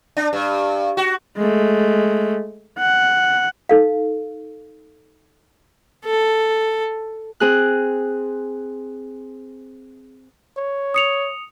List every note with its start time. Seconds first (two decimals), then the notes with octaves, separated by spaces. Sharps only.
0.17 D4
0.33 G2
0.97 F#4
1.37 G#3 A3
2.79 F#5
3.69 D#4 A4 F5
6.05 A4
7.40 C4 G#4 F#6
10.57 C#5
10.94 D#6 C#7 F7